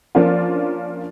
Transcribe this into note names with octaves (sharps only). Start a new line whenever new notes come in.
F3 A#3 C#4 D4 F4